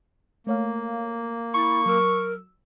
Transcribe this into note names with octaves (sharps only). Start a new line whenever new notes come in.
A3 A#3 C#5 F5
E4 B5 C#6 A6
F#3 A#4 E6